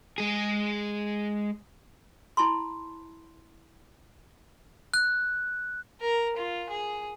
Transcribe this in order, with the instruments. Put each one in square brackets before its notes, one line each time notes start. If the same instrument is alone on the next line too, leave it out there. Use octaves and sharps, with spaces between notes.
[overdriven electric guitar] G#3 G#4
[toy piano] E4 A5 B5 C6
[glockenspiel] F#6
[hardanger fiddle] A#4
F4
G#4